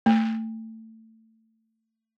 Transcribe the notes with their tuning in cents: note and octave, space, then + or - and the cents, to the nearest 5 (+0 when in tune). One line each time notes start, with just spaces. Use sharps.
A3 +20